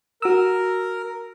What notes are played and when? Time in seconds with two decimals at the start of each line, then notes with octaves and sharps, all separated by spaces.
0.22 F#4 A#4 E6